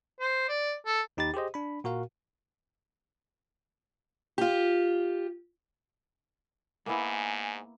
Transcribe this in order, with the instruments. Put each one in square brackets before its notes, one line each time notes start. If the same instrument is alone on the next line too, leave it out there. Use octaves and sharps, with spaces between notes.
[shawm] C5
D5
A4
[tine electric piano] D#2 D#4 G4 B5 A6
G4 G#4 C5 D#5
D4 B5
A#2 F#4 A#4 F5
[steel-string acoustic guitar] F4 G4
[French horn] G#2 [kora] A#3 B3 E4 [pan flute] G#5